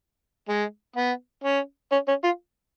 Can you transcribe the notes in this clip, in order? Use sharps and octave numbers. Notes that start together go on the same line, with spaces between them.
G#3
B3
C#4
C#4
C#4
F4